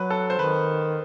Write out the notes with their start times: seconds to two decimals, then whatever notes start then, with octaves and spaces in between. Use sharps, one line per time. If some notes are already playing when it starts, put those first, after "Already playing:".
Already playing: F#3 B4
0.10 A4
0.30 C5
0.39 D#3 B4